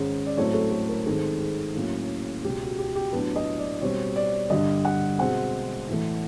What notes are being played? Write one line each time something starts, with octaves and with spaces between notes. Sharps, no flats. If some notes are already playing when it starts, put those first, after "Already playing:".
Already playing: G#2 D#3 G#3 C#4
D5
A2 F#3 A3 C4 C#5
A4
A4
A#4
G#2 D#3 G#3 C4 A4
G#4
A2 F#3 A#3 C#4
C#2 B2 G#3 G4
F#4
G4
G4
A2 F#3 B3 D4 B4
D#5
D5
B2 G3 C4 C#5
D5
G2 D3 G3 D#5
F#5
B2 G#3 C4 F#5
A2 E3 A3